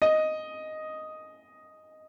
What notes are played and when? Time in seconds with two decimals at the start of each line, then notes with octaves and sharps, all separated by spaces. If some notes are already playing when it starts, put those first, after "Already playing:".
0.02 D#5